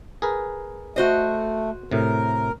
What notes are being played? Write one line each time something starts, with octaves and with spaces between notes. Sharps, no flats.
G#4 A#4 B4
A3 F#4 C5 D#5
A2 C3 A#4